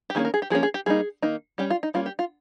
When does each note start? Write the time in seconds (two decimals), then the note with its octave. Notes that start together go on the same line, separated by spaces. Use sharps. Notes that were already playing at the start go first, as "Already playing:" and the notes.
0.10 G4
0.15 D#3 A#3 C#4 G#4
0.25 A#4
0.34 G#4
0.42 G4
0.50 F3 A#3 C#4 G#4
0.63 G#4
0.74 G4
0.86 G3 A#3 D#4 G#4
1.22 D#3 A#3 D#4
1.58 G3 C#4 G4
1.70 F4
1.83 D#4
1.94 G3 A#3 C#4 F4
2.06 G4
2.19 F4